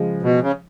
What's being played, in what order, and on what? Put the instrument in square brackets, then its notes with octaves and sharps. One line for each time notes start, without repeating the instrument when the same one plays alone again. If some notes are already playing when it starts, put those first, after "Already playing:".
Already playing: [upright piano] C#3 F3 G#3
[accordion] B2
C#3